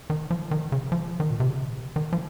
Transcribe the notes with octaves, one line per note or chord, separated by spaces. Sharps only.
D#3
F3
D#3
C#3
F3
D#3
A#2
C3
C#3
D#3
F3